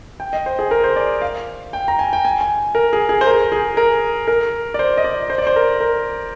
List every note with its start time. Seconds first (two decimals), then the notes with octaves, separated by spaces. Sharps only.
0.20 G5
0.33 D#5
0.46 C5
0.59 G#4
0.71 A#4
0.84 C5
0.96 D5
1.22 F5
1.73 G5
1.88 A#5
1.99 G#5
2.13 G5
2.25 G#5
2.41 G#5
2.75 A#4
2.93 G#4
3.09 G#4
3.21 C5
3.27 A#4
3.52 G#4
3.77 A#4
4.28 A#4
4.74 D5
4.79 C5
4.97 D#5
5.04 D5
5.30 C5
5.38 D5
5.47 C5
5.56 A#4
5.80 A#4